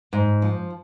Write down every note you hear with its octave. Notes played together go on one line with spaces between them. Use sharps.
G#2
F3